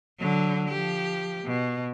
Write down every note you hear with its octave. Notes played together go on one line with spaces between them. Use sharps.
D3 F#3
F3 G4
B2